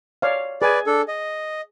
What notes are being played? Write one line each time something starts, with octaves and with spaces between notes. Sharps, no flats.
C#5 D5 F5
G#4 B4 D5 G#5
D4 A4
D#5